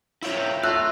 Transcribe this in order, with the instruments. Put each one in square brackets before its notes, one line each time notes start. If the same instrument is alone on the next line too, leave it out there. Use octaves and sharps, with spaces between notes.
[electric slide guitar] E4 F4 C#5 [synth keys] E5 G5 A#5
[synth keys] A3 [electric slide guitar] F4 [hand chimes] E5 F#6 [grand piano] E6